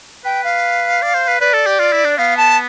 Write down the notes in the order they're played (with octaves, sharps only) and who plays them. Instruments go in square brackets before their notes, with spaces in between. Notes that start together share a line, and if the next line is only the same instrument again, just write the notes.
[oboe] B4 [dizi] G5
[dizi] F5
[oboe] D5
C5
B4
[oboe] B4 [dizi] D5
[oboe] A4
G4
F4
E4
D4
[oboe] B3 [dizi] F5
[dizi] A5